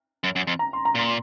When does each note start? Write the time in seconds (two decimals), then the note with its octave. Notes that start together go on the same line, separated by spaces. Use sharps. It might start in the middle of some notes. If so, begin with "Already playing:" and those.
0.24 F#2
0.36 F#2
0.47 F2
0.59 A#5
0.73 C6
0.85 A#5
0.95 A#2 C6